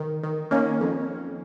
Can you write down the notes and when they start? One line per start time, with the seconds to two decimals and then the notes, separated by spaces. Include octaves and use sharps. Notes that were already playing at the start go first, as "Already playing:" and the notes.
Already playing: D#3
0.23 D#3
0.51 D#3 A#3 C#4
0.80 F2